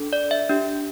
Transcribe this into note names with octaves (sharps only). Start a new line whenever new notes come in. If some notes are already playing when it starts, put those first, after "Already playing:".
Already playing: D4 A4
D5
E5
D4 G4